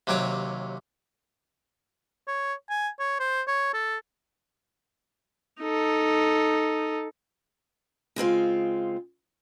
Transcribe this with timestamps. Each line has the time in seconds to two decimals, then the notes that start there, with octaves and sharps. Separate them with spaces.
0.07 D#2 C3 F#3 C#5 D6
2.27 C#5
2.70 G#5
2.99 C#5
3.20 C5
3.47 C#5
3.73 A4
5.61 D#4 A4
8.16 C#3 G#3 C4 F4